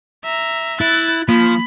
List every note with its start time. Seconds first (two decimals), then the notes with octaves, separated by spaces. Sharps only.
0.24 E5 A#5
0.81 E4 F#6 A6
1.29 F3 A#3 B5